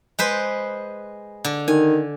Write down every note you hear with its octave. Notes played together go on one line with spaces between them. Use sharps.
G#3 B4 C5
D3
D#3 G#5